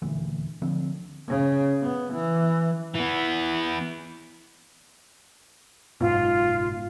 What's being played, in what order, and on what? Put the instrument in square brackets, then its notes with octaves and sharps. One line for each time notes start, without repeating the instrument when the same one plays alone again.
[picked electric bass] D#1 D2 E3
D2 D3 F3 C4
[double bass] C#3
B3
E3
[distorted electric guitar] E3 B3
[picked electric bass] F#1 G#2 B2 [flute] F4